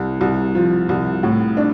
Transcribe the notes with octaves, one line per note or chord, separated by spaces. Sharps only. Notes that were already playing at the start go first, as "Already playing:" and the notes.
Already playing: C2
C2
F3
C2
A2
D4